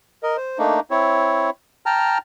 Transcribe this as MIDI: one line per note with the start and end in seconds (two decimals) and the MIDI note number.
0.23 0.37 70
0.23 0.37 75
0.37 0.58 72
0.58 0.80 57
0.58 0.80 58
0.58 0.80 62
0.58 0.80 63
0.91 1.50 60
0.91 1.50 64
0.91 1.50 73
1.86 2.18 79
1.86 2.18 81
1.86 2.18 82
1.86 2.18 89